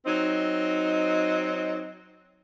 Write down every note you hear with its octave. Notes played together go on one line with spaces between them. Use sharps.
F#3 C4 D#4